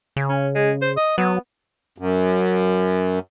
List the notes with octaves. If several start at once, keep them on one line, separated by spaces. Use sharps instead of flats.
C#3
C#4
G#3
C5
D#5
F#3 B3
F#2